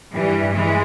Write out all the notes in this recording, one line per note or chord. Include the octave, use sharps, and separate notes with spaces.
G2 E3 G3
E3 G#3